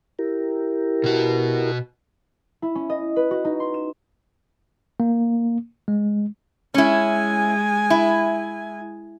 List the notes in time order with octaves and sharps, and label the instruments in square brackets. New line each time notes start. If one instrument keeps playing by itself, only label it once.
[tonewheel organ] E4 G4 A#4
[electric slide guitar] B2 F#4
[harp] E4
C#4
D#5
B4
F#4
D#4
C6
E7
[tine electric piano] A#3
G#3
[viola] G#3 G#5 [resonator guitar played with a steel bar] C#4 E4
[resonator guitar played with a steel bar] E4